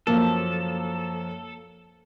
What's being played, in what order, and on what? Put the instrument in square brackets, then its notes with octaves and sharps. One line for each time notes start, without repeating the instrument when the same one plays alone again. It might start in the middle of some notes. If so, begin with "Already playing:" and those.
[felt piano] F#2 F3 [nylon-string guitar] A#3 [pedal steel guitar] A4